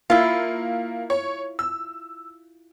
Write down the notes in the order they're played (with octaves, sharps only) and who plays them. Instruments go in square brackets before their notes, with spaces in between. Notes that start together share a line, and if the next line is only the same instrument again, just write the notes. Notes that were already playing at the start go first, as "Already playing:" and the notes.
[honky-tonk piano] A#3 [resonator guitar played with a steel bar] E4 F4
[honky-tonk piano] C#5
E6